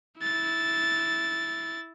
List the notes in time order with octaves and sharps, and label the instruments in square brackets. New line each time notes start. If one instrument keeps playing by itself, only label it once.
[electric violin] E4 A6